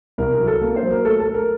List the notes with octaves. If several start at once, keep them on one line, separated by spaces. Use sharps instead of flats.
C2 A#4
A#4
F#3
A4
A#3 A#4
C5
F#3
A#4
A3 A4
A4
A3
A#4